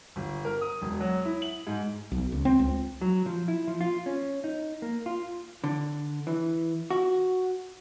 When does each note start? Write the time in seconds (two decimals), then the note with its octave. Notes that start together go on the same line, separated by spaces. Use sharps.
0.16 G1
0.45 A#4
0.61 D#6
0.82 E1
1.00 F#3
1.25 E4
1.42 F#7
1.67 G#2
2.11 B1
2.32 C#2
2.45 C4
2.59 C#2
3.01 F#3
3.26 F3
3.48 E4
3.67 F3
3.81 F4
4.06 C#4
4.44 D#4
4.82 A#3
5.06 F4
5.64 D3
6.27 E3
6.90 F#4